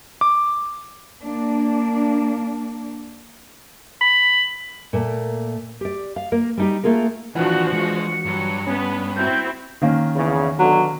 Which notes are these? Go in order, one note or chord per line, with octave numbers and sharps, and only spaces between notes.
D6
A#3 D4
B5
A#2 A3 A#3
G4 D5
F5
A#3 A#4
G3 D#4 G4
A3 A#3 F4 G#4 A#4
D#2 E3 F3 D4 F4 F#4 F#5
G#3 C#7
G2 F#3
B3 C#4 B4
C4 E4 F#4 G6
D#3 A#3 C#4
E2 C#3
B1 B2 D3 F#3